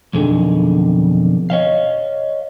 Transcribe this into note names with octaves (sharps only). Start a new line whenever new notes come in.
B1 F2 D3 D#3 G#4
C#5 D#5 F5